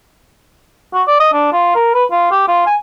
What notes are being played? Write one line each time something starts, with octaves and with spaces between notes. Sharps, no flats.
F#4
D5
D#5
D4
F4
A#4
B4
F4
G4
F4
G#5